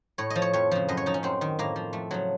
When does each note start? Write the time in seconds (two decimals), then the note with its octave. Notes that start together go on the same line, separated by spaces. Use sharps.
0.18 A2 C#5
0.30 D#5
0.35 F3
0.42 C#5
0.53 F2 C#5
0.71 C#3 F3
0.89 F#2 D#5
0.97 C#5
1.06 F3 D#4
1.14 C#4
1.23 F#2 C4
1.41 D#3
1.59 A2 A#3
1.76 F3
1.93 F2 A3
2.11 C#3 F3 F#3